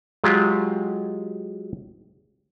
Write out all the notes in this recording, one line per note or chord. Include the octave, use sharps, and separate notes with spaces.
F#3 G#3 F4 G4